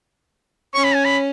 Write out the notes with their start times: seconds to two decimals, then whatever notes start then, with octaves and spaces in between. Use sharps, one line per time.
0.74 C#4 C#6
0.84 B5
0.95 G#5
1.05 B5